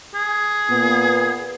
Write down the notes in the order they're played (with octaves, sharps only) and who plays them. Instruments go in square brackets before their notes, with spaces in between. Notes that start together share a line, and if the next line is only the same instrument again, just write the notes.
[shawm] G#4
[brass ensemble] A#2 B3